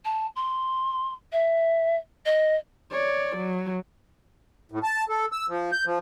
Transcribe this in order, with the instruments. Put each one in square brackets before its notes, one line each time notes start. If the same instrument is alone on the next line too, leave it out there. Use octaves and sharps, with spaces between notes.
[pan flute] A5
C6
E5
D#5
[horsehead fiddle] C#5 D5
F#3
[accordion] A2
A5
A4
E6
F3
G6
F3